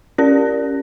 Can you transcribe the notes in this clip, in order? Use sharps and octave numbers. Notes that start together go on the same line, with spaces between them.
C#4 G4 A#4 D5 A#6